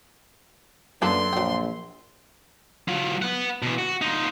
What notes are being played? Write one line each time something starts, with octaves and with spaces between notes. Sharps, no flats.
F#2 D3 A#3 B3 A4 B4 C6
A#1 F#3 G5
F#3 F4
B4 F#5
B2 E3
F#4
D#4 F4